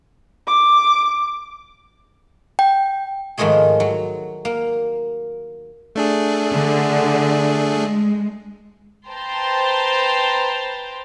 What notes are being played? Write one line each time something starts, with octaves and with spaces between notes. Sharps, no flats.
D6
G5
G#2 D#3 F3 G#3 A3 G#4
F#3
A#3
A3 D4 G#4
D3
G#3
B4 C5 G5 A5 A#5 C6